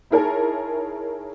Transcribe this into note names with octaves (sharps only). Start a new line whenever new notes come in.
D#4 E4 G#4 A#4 C#5 A5